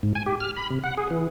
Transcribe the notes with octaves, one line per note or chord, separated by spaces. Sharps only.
G#2
G#5
G4
F6
B5
C3
F#5
G#4
E3